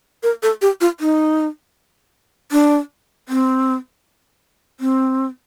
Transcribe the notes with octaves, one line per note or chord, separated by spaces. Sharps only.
A#4
A4
G4
F4
D#4
D4
C4
C4